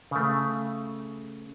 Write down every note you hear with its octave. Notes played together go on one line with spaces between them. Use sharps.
C#3 A3